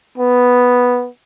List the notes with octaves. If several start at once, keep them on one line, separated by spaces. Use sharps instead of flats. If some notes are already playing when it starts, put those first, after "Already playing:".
B3